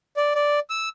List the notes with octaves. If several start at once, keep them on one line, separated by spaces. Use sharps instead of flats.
D5
D5
E6